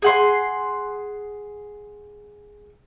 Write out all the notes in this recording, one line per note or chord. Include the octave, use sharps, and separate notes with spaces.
G#4 F#5 C6